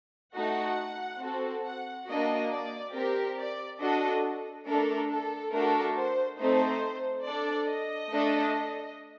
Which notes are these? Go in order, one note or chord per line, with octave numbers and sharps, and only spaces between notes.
A3 D#4 F#4 F#5
C4 F#4 A4
F#5
A#3 D4 F#4 D#5
D5
C4 G4 A#4
D5
D4 F#4 A4 D#5
A3 D4 A4 A#4
A4
A3 D4 F#4 A4 A#4
C5
A3 C4 D#4 A4 C5
D4 A4 D5
D#5
A3 D4 A4